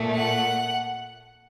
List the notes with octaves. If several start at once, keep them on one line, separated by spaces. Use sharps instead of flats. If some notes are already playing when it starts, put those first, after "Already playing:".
Already playing: A#2 A3
F#5